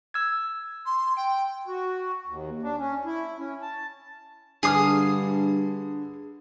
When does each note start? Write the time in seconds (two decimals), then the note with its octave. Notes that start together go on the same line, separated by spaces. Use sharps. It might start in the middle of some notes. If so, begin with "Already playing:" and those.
0.14 E6 G#6
0.86 C6
1.17 G5 D7
1.67 F#4
2.27 D#2
2.62 D4
2.78 C#4
3.05 E4
3.38 C#4
3.62 A5
4.63 G2 D3 G#4 G#5 D#6 F6 C7